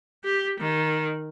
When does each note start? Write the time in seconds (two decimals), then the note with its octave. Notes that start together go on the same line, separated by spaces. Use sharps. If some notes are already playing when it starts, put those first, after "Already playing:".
0.25 G4
0.60 D#3